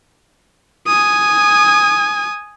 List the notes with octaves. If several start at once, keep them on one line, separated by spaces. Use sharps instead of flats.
G#5 D#6